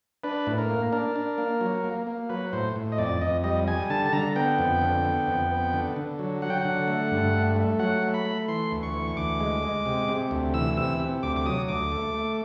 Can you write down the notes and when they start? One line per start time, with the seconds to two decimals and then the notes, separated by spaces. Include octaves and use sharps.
0.24 D4 B4
0.47 A2
0.58 A#4
0.69 A#3
0.92 D4 A#4
1.16 D4
1.38 A#3
1.61 F#3
1.84 A#3
2.07 A#3
2.29 F#3 B4
2.53 A2 C5
2.76 A2
2.92 D#5
2.98 F2 D5
3.21 F2 D#5
3.44 G3 D#5
3.68 G3 G#5
3.90 D3 A5
4.06 A5
4.13 D3 A#5
4.36 B3 G5
4.58 F2
4.82 D3
5.05 B3
5.27 F2
5.51 B3
5.73 D3
5.96 D3
6.19 F#3
6.42 F#3 F#5
6.50 G5
6.57 F#5
6.65 D3
6.88 A3
7.11 G2
7.34 A3
7.56 A3
7.79 F#3 F#5
8.03 A3
8.14 B5
8.25 A3
8.48 E3 C6
8.72 D2
8.83 C#6
8.94 E3
9.17 D2 D6
9.40 G#3
9.63 G#3
9.86 C3
10.08 C3
10.31 D2
10.54 E3 E6
10.77 C3 E6
11.00 C3
11.23 D2 D6
11.36 D6
11.46 F#3 D#6
11.68 D2 D6
11.92 A3
12.14 A3